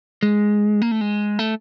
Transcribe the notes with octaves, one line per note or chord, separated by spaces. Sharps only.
G#3
A#3
A3
G#3
A3